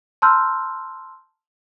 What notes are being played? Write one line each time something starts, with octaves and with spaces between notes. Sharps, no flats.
A5 A#5 C6 E6 F6 G6